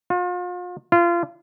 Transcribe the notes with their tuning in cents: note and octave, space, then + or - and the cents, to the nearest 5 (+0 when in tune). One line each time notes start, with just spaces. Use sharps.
F4 +40
F4 -25